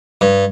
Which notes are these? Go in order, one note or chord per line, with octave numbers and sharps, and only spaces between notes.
G2